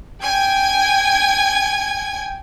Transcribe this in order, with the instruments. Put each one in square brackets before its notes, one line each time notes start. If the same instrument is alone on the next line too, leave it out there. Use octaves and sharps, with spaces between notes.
[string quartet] G5 G#5 G#6